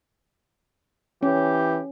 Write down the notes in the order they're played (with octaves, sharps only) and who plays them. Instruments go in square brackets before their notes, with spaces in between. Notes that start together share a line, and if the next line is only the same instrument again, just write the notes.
[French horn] E3 [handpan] C#4 [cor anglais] G4